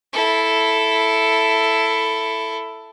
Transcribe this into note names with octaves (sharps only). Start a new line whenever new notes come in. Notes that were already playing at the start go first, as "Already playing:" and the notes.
E4 A4